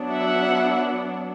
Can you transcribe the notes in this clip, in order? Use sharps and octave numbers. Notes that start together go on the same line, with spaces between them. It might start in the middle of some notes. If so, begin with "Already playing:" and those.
Already playing: F#3 B3 D4
E5 F#5